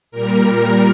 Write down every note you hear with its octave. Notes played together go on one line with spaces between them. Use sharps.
A#2 G3 A#4